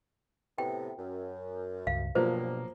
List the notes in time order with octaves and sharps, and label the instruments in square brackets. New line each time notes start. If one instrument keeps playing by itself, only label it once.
[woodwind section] A2 C3 B3 [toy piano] G5
[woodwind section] F#2
[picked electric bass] C#2 G2 [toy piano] F5
[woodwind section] G2 [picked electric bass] B2 [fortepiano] F3 F#3 A#3 [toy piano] C5